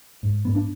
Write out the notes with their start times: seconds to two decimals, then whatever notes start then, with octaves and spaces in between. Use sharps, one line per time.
0.23 G#2
0.45 G#2 B3
0.55 D4